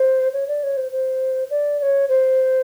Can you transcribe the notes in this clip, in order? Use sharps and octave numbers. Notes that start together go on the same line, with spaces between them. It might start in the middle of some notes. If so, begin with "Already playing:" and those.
Already playing: C5
C#5
D5
C#5
C5
C5
D5
D5
C#5
C5